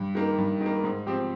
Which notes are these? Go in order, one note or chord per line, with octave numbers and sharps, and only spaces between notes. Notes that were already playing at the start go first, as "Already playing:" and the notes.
Already playing: G2
D#3 A#3
G2
D#3
A#3
G#2
F3 C4 G4